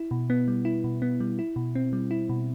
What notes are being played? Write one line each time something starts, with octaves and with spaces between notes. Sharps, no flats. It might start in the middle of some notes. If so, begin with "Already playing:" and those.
Already playing: E4
B2
B3
G3
E4
B2
B3
G3
E4
B2
C4
G3
E4
B2